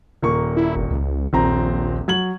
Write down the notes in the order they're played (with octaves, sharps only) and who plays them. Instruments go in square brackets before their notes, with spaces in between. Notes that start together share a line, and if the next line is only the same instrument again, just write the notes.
[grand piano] D#1 A#3 C#6
[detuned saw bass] E4
G1
C#2
[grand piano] D#1 C4 A#5 [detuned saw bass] A#1
[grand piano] F#3 G#6 F#7